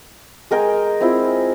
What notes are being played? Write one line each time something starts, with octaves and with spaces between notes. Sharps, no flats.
G#3 A#4 G5 G#5
C4 E4 F4